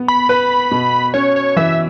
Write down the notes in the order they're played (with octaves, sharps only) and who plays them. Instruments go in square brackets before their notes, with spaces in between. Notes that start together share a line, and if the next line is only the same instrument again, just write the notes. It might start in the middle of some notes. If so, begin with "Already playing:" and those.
Already playing: [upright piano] B3
[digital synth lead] B5
[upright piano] B4
B2
[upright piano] C#4 [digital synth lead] C#5
[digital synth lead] C#5
[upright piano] E3 [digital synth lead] E5